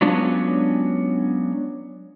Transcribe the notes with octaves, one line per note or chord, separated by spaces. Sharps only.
F#3 G#3 B3 C#4 D4 F4